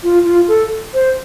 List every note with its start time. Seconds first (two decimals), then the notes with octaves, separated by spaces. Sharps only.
0.03 F4
0.25 F4
0.48 A4
0.94 C5